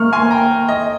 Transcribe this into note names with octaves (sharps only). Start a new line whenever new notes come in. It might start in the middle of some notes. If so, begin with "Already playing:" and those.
Already playing: A#3 C#6 F6
G#5 C6
G5 A#5
D#5